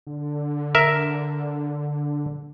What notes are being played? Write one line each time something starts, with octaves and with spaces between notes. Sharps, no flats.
D3
A#4 E5